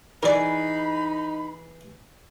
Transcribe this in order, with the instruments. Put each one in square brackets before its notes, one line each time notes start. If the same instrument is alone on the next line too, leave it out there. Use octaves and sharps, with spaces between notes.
[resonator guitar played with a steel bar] E3 G#4 [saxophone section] D#4 [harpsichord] A#4 D5 [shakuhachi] B5